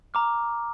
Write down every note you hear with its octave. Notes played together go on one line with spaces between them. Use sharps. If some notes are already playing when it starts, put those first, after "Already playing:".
A#5 D6 F6